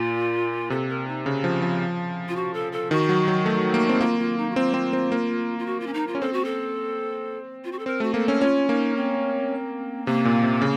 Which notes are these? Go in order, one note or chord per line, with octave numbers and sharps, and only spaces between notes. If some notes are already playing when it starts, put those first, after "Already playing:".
Already playing: A#2 F4
C3 A4
A#4
D#4
C#3
F3
F3
F4
F#4
A4
A4
D#3 F#4
F#3
F#3
A3
A#3
C4
A#3 F4
F4
D#4
F#4
C4 F4
C4
C4
A#3
F4
F#4
F4
C#4
D#4
F4
C#4
C4 A4
F#4
A4
F4
F#4
A4
C4 A#4
A3 F#4
A#3 A4
C#4
C#4 F4
A#3 D#4
C4
C3 A#3
A#2
C3
C#3